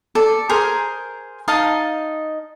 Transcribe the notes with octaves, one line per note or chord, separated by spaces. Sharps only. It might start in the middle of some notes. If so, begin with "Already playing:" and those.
A4 D5
G#4 A#4 C5
D#4 D#5 F5 A5